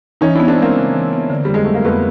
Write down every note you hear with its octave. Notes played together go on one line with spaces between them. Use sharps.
E3 C#4 D#4
B3 D4 E4
C4 D4
G#3 A#3 C4
C#3
E3
B3
D3
F2 G3
G#3
F#3 A3
A#3
F2 A3 B3